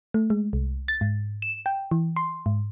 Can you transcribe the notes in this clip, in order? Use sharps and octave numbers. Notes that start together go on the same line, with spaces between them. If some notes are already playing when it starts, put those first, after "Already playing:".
A3
G#3
C2
A6
G#2
E7
G5
E3
C6
G#2